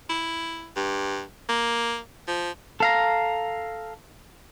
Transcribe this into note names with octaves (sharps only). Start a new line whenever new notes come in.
E4
G2
A#3
F3
A4 F5 A#5